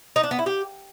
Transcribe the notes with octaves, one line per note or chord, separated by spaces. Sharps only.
D#4
D4
B3
E4
G4